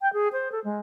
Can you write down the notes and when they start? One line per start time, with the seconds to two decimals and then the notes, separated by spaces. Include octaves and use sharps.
0.01 G5
0.13 G#4
0.33 C5
0.52 A4
0.64 G#3